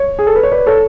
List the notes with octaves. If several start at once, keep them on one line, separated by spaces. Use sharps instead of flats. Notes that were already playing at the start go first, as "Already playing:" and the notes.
Already playing: C#5
G#4
A4
B4
C#5
B4 D5
A4 C#5